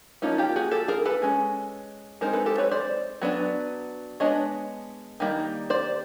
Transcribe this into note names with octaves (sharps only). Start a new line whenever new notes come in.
F3 A#3 C#4 D#4 F4
F4 G4
F#4 G#4
G4 A4
G#4 A#4
A4 B4
G#3 C#4
G#3 C4 D#4 A#4 C5
A4 B4
G4 A4
B4 C#5
C5 D5
F#3 B3 D4
G#3 B3 D4 C#5 D#5
D#3 G3 A#3 D#4
C5 D5